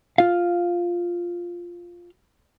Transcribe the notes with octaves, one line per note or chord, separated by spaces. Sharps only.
F4 F5